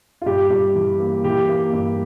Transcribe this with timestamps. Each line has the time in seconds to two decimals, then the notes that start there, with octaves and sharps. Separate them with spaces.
0.22 F4
0.26 G2 G4
0.50 G2
0.75 E3
1.00 A#3
1.24 E3 G4
1.49 A#3
1.73 G2